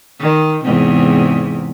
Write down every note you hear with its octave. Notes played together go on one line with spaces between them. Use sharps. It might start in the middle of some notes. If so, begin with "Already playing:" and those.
D#3
E2 G#2 C3